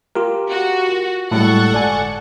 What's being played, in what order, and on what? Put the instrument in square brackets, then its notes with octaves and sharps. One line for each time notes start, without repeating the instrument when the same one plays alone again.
[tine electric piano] F4 G4 A#4
[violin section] F#4
[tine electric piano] A2 G3 G#3 [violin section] A4 F#5 C#6
[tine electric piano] G1 D5 G#5